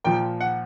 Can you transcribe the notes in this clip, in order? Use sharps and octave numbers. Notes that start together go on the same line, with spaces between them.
A#2 F3 G5
F#5